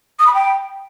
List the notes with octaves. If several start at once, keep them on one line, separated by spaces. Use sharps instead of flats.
D#6
B5
G5